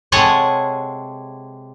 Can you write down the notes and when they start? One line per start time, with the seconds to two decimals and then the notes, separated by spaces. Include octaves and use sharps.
0.12 C3 G#3 A4 C#5 F#5 G#5